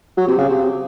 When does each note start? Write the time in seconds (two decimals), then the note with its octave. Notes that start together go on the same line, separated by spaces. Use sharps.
0.17 F#3
0.28 C3
0.38 C#3
0.49 C3